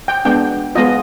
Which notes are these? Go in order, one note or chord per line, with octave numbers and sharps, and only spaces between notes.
G5
G#3 B3 D4 G5
G#3 B3 F4 D#5